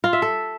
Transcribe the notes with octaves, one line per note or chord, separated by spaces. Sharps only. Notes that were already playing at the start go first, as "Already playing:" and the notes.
F4
E5
A4